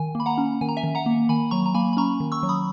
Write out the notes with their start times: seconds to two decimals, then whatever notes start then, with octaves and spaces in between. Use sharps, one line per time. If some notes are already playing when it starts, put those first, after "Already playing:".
Already playing: D#3 G#5
0.15 A#3 B5
0.26 F#5 A#5
0.38 C#4
0.61 D#3 G#5
0.69 A#5
0.77 E5 G#5
0.84 D#3
0.95 F#5 A#5
1.06 A#3
1.29 D#3 G#5 B5
1.51 F#3 A#5 C#6
1.66 A#5
1.75 A#3 G#5 B5
1.93 B5
1.97 C#4 A#5 C#6
2.20 D#3
2.32 C#6 E6
2.43 F#3
2.49 B5 D#6